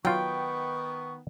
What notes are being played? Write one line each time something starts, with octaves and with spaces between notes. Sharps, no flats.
D#3 F#3 B3 F4 G5 C#6